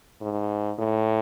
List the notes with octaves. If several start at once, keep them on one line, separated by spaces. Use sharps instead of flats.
G#2
A2